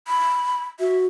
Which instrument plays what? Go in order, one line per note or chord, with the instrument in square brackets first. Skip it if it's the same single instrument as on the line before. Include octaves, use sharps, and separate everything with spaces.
[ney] B5
[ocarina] F#4 [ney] E5